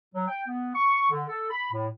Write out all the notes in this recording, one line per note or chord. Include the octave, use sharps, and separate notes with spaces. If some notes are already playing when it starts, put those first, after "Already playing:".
F#3
G5
B3
C#6
D3
A4
B5
A2